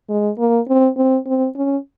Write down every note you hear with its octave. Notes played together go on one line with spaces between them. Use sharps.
G#3
A#3
C4
C4
C4
C#4